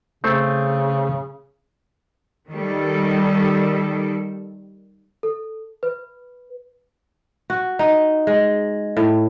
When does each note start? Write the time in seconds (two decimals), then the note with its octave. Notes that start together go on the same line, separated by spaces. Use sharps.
0.24 C#3 A3 C4 A4
2.50 D#3 G3 A4
5.23 A4
5.83 B4
7.50 F#4
7.79 D#4
8.27 G#3
8.97 A2